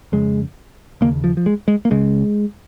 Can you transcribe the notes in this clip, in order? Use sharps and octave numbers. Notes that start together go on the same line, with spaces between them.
F2 C#3 G#3
D#2 C#3 A#3
F3
F3
G#3
G#3
A#3
C#2 C#3 G#3